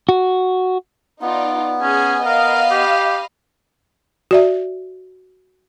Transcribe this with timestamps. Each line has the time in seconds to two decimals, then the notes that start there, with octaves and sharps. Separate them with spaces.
0.09 F#4
1.22 B3 D#4 F4 D5
1.82 C#4 G#4 G#5
2.26 A#4 D#5 F5 B5
2.71 G4
4.31 F#4 D5 E5